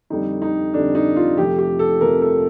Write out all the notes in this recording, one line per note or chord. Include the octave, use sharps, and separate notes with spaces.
F2 D3 G3 D#4
D#4
F2 D3 G3 D4
D#4
F4
F2 C3 F3 A3 G4
G4
A4
F2 C3 F3 A3 A#4
A4